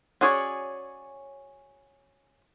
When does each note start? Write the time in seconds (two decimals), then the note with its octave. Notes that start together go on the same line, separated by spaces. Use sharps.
0.21 C#4 F#4 G#4 C#5 D5